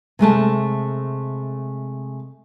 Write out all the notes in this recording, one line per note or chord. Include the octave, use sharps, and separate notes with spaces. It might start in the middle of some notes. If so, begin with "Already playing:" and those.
C3 G#3 A3 A5